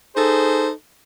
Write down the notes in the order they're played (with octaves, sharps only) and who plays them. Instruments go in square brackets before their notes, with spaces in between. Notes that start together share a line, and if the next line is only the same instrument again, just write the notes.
[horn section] D#4 G#4 A4 C5